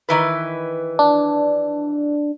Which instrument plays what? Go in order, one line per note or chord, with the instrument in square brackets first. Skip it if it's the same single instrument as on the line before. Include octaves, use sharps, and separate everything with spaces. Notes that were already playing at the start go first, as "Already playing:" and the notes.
[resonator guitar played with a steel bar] D#3 E3 B4
[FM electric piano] D4